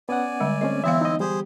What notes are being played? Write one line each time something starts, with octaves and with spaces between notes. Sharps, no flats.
B3 C#4 D5 F#5 G#5
D3 G3 G#3
A3 C4 C#4 D#5
E3 B3 C4 E4 E5 F5
D#4 D#5
G3 G4 G#4 C5